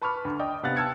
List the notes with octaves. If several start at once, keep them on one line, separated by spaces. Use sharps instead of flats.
B4 A5 B5 C#6 D6 F6
D2
D5 D#5 G5 D#6
C3 B3 F5 F#5 F#6 A6
G5 A5 E6 F6 G#6 C#7